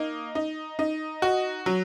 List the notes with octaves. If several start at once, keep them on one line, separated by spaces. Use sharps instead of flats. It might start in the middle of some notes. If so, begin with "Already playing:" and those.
Already playing: A#3 D#4
D#4
D#4
F#4
F#3